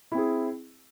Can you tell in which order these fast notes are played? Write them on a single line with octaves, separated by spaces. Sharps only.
E4 C4 G#4